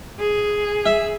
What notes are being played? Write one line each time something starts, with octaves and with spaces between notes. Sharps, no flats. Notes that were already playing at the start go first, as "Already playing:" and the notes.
G#4
E5